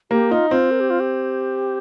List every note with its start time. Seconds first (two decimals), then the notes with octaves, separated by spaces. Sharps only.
0.11 A#3 G4
0.31 D#4 F4
0.50 C4 F4
0.71 A#4
0.80 G4
0.90 F4
1.00 G4